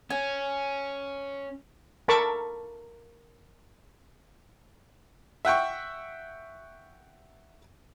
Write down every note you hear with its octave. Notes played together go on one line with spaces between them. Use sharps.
C#4 G#5
A4 A#4 A5 B5 C#6 D6
E5 F#5 G5 C#6